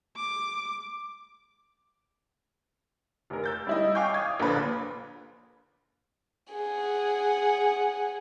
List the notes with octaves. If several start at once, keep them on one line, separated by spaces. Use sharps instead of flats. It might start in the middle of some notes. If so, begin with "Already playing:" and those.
D6
F1 A#4
E6 G6 A6
G3 E4 D#5
F5 G5 G#5 C#6 D6 G6
D#6 G#6
A#1 A#2 D3 F3 B4
G#4 F#5